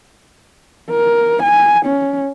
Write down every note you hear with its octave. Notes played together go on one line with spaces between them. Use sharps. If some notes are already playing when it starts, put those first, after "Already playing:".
A#4
G#5
C#4